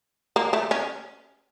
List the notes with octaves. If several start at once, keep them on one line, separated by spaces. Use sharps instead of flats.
A#3
A3
C#4